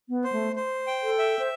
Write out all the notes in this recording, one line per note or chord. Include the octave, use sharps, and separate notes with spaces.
B3
C5
A3
C5
G5
A4
E5
C5